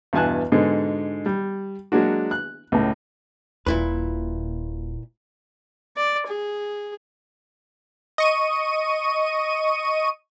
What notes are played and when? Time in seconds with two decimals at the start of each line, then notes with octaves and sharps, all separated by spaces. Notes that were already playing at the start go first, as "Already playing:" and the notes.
0.13 E2 G2 B2 G#5 A5 F#6
0.52 G#2 B2 D3 G#3
1.26 G3
1.92 F#3 G#3 A#3 D4 F#4
2.31 F#6
2.72 C#2 A2
3.66 D#1 A#2 E4 F4 B4
5.97 D5
6.28 G#4
8.18 D#5 C#6 D#7